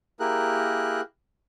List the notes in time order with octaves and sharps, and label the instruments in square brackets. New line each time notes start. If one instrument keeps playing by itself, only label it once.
[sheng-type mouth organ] A#3 E4 G4 G#4 A#4 F#6